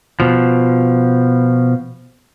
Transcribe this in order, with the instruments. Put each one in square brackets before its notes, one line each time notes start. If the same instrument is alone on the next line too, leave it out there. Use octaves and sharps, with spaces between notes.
[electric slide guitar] B2 F3